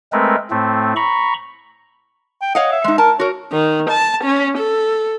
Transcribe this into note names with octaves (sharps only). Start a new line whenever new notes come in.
G#3 A3 C4 A#4 B4
A2 A3 C4
A#5 B5 C#6
G5
C#5 D#5 F5 F#5
E5
G#3 D#4
A#4 A5
F#4 A#4 C#5
D#3
A5
C#4
A4